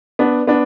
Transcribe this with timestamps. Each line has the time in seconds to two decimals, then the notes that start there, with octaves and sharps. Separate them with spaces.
0.19 B3 D4
0.47 B3 D4